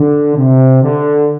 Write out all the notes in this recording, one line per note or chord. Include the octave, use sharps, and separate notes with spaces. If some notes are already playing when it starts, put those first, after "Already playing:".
Already playing: D3
C3
D3